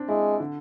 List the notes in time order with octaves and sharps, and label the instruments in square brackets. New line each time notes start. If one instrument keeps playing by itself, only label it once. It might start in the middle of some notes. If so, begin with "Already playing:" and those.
Already playing: [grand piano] C4 D4
[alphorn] G#3 [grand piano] E4
[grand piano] D3